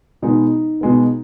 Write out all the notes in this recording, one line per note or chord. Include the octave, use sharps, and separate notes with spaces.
B2 G#3 B3 D#4
B2 G#3 B3